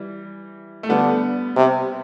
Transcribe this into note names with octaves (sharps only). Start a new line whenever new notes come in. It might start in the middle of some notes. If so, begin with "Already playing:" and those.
Already playing: E3 G3
A3
D3 G3 B3
C3